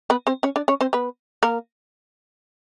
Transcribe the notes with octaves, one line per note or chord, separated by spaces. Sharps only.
B3 B4
C4 C5
C#4 C#5
D4 D5
C#4 C#5
C4 C5
B3 B4
A#3 A#4